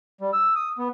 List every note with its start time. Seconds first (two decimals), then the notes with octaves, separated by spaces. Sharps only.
0.21 G3
0.33 E6
0.56 D#6
0.78 B3